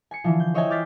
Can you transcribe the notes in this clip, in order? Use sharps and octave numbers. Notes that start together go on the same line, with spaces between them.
G#5 C7 C#7
D3 E3 F3
G6
C5 C#5 D#5 E5 G5 G#5
D6 F6 G6 A6 B6 C7